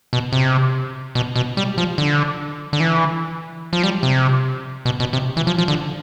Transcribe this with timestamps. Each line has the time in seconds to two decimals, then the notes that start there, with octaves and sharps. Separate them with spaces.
0.13 B2
0.33 C3
1.15 B2
1.36 B2
1.57 G3
1.78 F3
1.98 D3
2.73 D3
2.80 E3
3.73 F3
3.83 G3
4.03 C3
4.85 B2
5.00 B2
5.13 C3
5.37 E3
5.47 F3
5.58 F3
5.68 D3